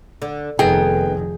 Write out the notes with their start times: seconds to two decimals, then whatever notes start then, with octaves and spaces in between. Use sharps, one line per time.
0.22 D3
0.59 F1 D#3 B3 D#4 G#4 A4 G5